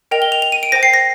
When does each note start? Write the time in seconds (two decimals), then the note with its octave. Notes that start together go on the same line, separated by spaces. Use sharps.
0.11 A#4 D#5 G5 F7
0.22 G7
0.32 F7
0.42 F7
0.52 D#7
0.63 D7
0.72 C5 G5 A#6
0.83 C7
0.94 A#6